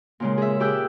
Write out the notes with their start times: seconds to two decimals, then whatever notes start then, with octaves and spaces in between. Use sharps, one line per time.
0.20 A#2 C#3 G#3
0.38 G#4 E5
0.60 G4 G#4 G5 D6 E6 F#6